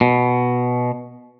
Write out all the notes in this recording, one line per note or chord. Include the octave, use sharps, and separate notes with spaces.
B2